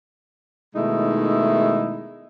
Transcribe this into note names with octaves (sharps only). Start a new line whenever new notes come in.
B2 D#3 G#3 A3 D#4 E4